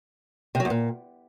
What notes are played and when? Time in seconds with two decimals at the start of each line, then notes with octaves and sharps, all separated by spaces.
0.55 C3
0.60 F#3
0.65 E2
0.70 A#2